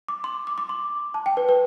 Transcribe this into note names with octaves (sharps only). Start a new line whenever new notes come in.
D6
C6
D6
D6
C6
A5
G5
B4
B4